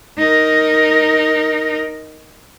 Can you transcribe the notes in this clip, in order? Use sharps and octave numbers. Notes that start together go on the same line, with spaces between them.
D#4 A#4